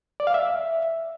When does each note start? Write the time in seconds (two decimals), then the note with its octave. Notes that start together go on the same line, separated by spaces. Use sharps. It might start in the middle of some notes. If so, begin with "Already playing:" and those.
0.20 D5
0.27 F5
0.34 E5